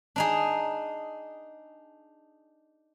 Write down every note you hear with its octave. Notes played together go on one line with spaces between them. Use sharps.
D4 D#4 G#4